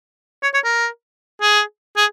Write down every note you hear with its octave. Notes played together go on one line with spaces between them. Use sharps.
C#5
C#5
A#4
G#4
G#4